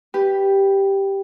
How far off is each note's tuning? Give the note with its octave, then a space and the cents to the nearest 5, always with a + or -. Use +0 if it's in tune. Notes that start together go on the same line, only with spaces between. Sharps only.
G4 +0 B4 +0